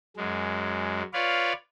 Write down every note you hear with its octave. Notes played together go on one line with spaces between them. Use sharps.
F#2 G#3
F4 B4 C#5 D5 F5